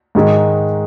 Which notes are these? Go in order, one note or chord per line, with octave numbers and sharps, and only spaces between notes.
G#2 D#3 G#3 D#4